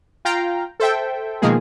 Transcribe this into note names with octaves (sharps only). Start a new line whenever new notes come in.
F4 F5 G5 A#5
A4 C5 E5 G5
B2 D#3 F3 G#3 A#3 G#4